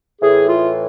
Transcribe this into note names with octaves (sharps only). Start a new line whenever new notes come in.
A2 E3 G#4
F4